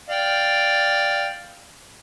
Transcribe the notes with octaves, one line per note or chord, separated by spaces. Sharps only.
D5 F5 G5